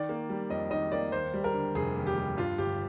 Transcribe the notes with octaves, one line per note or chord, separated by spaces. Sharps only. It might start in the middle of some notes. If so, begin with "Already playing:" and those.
Already playing: D#3 D5
A#3
G3
F2 D#5
D#3 D#5
A#3 D5
D#2 C5
G3
A#4
D3
F1 G#4
D#2
G4
G3
G2 F4
G1 G4